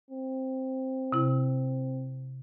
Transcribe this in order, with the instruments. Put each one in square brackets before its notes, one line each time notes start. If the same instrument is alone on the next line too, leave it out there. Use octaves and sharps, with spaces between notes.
[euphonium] C4
[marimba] C3 E4